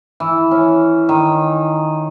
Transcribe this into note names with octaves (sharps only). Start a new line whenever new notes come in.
E3
C#4
D#3